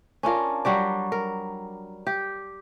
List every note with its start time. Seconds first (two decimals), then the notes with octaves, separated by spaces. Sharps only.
0.23 C#4 D4 F4 A#4
0.65 F#3 G3 F#4 D5
1.12 A#4
2.07 G4